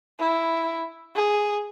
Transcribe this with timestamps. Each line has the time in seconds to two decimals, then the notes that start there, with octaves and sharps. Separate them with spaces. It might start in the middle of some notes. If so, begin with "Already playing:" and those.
0.19 E4
1.15 G#4